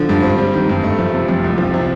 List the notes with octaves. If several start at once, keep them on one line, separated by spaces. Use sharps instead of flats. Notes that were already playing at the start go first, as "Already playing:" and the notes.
Already playing: D3 F3
G2
C4
G3
D#3
G2
A3
F3
C3
F2
C2
F3
C3